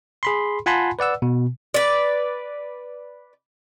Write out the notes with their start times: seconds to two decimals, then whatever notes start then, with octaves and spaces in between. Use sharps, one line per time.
0.23 G#4 B5 C6
0.66 F4 F#5 G#5 A5 B5 C6
0.99 B4 D5 F#5 E6
1.22 B2
1.74 B4 D5